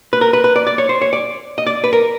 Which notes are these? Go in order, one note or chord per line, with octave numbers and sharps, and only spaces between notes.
B4
A#4
B4
B4
D5
D5
C#5
C5
C#5
D5
D#5
D5
B4
A#4